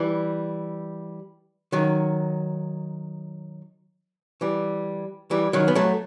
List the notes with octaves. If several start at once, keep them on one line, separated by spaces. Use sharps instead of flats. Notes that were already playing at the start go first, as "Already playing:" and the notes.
Already playing: E3 G3
D#3 F#3
E3 G3
E3 G3
D#3 F#3
B3
F#3 A3